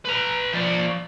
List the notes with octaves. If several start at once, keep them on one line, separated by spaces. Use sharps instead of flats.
B4 A#5
F3 D5